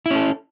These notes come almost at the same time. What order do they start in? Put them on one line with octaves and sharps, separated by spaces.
E4 C#4 A4